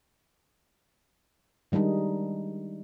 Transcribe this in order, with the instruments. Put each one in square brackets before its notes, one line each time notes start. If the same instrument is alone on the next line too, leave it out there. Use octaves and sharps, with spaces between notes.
[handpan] D#3 G3 G#3 D4 D#4